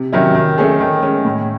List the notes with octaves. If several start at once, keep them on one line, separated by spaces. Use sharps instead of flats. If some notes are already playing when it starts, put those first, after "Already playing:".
Already playing: C3
D#3 F#3 C#4 E4
D#3
A3 C#4 G#4
D#3
G#3 C#4
A2